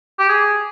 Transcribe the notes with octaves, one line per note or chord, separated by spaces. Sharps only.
G4
G#4